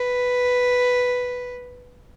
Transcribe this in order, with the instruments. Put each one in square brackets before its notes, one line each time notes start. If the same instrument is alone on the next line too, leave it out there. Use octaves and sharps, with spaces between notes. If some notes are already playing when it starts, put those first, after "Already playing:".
Already playing: [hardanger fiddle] B4